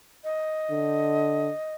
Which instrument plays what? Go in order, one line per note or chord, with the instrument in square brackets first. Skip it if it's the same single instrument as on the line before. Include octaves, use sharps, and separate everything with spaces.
[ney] D#5
[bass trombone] D3